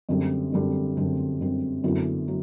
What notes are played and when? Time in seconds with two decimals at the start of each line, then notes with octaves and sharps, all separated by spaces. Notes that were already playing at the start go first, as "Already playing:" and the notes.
0.09 F#2 D3 G3 C4
0.52 F#2 D3 G3 C4
0.97 F#2 D3 G3 C4
1.41 F#2 D3 G3 C4
1.84 F#2 D3 F#3 B3 E4
2.28 F#3